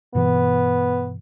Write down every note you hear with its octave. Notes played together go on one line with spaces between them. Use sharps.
G2 B2 E3 B3